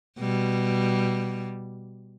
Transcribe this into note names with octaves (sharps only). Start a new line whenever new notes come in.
B2 G3